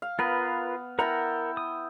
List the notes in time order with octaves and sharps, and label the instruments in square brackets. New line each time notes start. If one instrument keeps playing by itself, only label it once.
[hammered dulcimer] F5
[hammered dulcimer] B3 [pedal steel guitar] F4 A#4 B4
[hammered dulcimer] E4 G5 A5 [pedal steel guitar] A#4 F#5 A#5
[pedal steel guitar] D#6